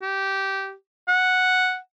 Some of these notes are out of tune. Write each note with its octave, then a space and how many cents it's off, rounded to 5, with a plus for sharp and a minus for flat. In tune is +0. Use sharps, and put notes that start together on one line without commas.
G4 -15
F#5 -5